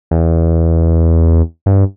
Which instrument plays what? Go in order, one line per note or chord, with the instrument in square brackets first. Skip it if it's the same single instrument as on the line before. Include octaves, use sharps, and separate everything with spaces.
[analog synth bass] E2
G2